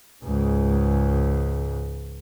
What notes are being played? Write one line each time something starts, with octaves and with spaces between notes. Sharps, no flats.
C#2 G#2